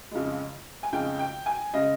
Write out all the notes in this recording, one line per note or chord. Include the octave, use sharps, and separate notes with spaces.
F2 C#3 G#3
G#5
F2 C#3 G#3 G5
G5
G#5
C#3 G#3 D#5